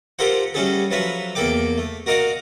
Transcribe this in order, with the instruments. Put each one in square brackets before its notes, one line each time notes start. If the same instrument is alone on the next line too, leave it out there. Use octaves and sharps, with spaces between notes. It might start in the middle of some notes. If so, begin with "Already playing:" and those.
[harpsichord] F4 G4 A4 A#4 C5 F#5
G3 A3 C#4 F#4 G#4 A4
F3 F#3 A4 B4 E5 F5
E2 A#3 A4 D5 G5 D6
A3
F#4 A#4 D5 D#5 F5 F#5